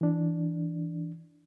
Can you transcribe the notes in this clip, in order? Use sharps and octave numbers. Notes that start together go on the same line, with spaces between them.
E3 D4